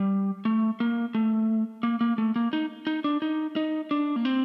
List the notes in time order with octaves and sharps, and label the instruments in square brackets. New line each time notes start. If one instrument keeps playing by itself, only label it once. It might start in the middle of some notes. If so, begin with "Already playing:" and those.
Already playing: [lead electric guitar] G3
A3
A#3
A3
A#3
A#3
A3
A#3
D#4
D#4
D4
D#4
D#4
D4
A#3
C4